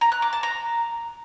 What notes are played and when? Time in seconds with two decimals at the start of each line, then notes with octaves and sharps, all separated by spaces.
0.01 A#5
0.12 F#6
0.22 D6
0.33 A5
0.43 A#5